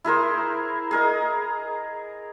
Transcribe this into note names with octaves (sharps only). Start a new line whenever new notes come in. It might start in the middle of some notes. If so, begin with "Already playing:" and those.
E4 G#4 A#4 C5
G#4 A#4 D#5